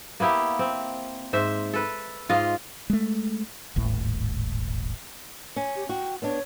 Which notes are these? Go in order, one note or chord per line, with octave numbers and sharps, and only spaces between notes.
A#3 B3 E4 G4
C4
G#2 C5 E5
A4 B4
G#2 F4 D#5 F5
G#3 A3
D#1 G#1 A2
C#4
G4
F#4 G5
B3 D4 C#5